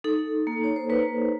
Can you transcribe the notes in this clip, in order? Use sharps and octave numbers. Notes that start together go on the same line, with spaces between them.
D#4 A4
A#3
C#5
C5
A#3 B4